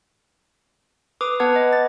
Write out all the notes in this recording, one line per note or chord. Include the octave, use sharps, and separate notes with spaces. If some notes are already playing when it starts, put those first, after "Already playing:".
B4 D6 D#6
B3 B4 F#5 A5 G#6
D#5
A6